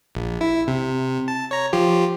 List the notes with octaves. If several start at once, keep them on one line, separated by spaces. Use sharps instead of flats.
A#1
E4
C3
A5
C#5 A#5
F3 F4 G4